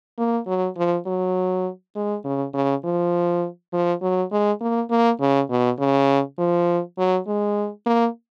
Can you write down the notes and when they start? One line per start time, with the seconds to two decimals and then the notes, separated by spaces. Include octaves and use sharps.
0.18 A#3
0.47 F#3
0.77 F3
1.06 F#3
1.96 G#3
2.24 C#3
2.54 C#3
2.84 F3
3.73 F3
4.02 F#3
4.32 G#3
4.61 A#3
4.90 A#3
5.20 C#3
5.50 B2
5.79 C#3
6.38 F3
6.98 F#3
7.27 G#3
7.86 A#3